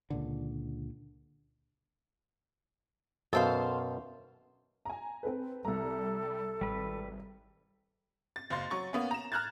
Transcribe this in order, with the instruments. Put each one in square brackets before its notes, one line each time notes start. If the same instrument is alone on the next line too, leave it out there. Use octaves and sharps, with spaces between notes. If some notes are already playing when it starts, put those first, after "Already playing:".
[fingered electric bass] C#2 A#2 D3
[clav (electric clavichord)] F#2 B2 [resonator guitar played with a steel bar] A4 C5 F5
[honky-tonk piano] G#5 A#5
C4 A4 B4
[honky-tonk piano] C2 A#5 [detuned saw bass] G3 [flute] A4
[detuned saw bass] G#1 [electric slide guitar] G3 B4
[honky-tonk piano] A6
F#1 F5 C6 A6
F#3 C#6 A6
A#3 B3 C#4
A#5 E7
A#5 F6 F#6 G#6 A6